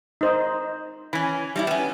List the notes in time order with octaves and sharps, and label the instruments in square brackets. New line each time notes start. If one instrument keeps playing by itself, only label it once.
[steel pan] D#4 C5 D#5
[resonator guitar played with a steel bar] E3 C#4 [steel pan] B5
[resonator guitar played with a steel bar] G3 D#4 E4
[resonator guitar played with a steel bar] B3 C#4 [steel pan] G5